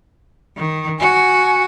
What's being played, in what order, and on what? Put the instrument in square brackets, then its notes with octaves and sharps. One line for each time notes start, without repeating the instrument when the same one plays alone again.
[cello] D#3
[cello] F#4 [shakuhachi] G#5